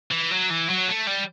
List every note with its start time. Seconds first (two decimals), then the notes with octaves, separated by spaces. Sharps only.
0.11 E3
0.31 F#3
0.50 E3
0.69 F#3
0.88 A3
1.07 G3